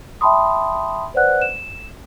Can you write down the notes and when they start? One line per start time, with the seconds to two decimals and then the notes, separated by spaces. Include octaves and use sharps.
0.21 E5 G5 A5 B5 C6 D#6
1.14 B4 C5 D5 F#5 F#6
1.42 E7